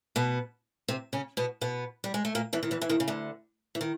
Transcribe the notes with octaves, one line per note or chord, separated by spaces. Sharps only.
B2 B3
C3 C4
C#3 C#4
B2 B3
B2 B3
G3
G#3
A3
A#2 A#3
E2 E3
D#3
E2 E3
E3
D#2 D#3
C#3
D2 D3
E3
D#3